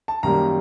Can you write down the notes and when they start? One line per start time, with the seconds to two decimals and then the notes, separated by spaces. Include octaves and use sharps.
0.08 A5
0.23 F#2 D#3 G3 A#3 A#5